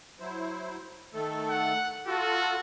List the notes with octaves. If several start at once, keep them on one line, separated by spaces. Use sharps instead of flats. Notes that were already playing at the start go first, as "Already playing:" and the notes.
F#3 E4 C5
D#3 A3 A4
F#5
F4 F#4 A4